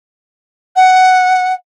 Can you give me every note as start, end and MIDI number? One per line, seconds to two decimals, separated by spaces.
0.76 1.54 78